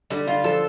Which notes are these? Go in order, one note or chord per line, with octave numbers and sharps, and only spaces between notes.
D3 G3
D3 F4
F3 A4